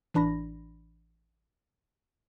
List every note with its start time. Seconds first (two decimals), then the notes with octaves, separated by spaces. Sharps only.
0.14 A1 E3 D4 B5 A#6